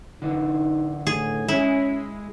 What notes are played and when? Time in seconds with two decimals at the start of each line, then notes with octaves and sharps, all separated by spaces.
0.22 D3 E3 D#4
1.07 A2 G#4
1.48 G#3 C#4 E4 G#4